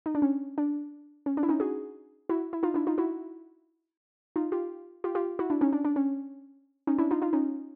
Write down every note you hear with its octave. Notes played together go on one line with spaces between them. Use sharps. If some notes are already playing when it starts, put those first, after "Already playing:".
D#4
D4
C#4
D4
C#4
D4
E4
C#4 D#4
F#4 G#4
E4 F#4
E4
D#4 F4
D4 E4
D#4 F4
E4 F#4
D#4 F4
F4 G4
F4 G4
F4 G4
E4 F#4
D4 E4
C#4 D#4
D4
D4
C#4
C#4 D#4
D4 E4
D#4 F4
D#4 F4
C#4 D#4